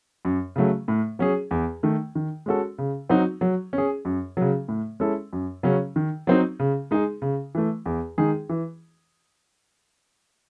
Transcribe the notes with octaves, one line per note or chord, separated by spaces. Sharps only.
F#2
C#3 F#3 A3
A2
F#3 C#4 G#4
E2
D#3 A3
D#3
G#3 C#4 F#4 A4
C#3
F#3 C4 D#4 F#4
F#3
C#4
G#4
F#2
C#3 F#3
A2
G#3 C#4 E4 A4
F#2
C#3 F#3 C#4
D#3
F#3 C4 D#4
C#3
G#3 D#4 G#4
C#3
E3 A3
E2
D#3 G#3 D#4 G#4
E3